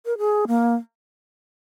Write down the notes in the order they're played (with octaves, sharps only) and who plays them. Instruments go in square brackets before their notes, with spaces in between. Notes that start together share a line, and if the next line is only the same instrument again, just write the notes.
[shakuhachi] A#4
G#4
A#3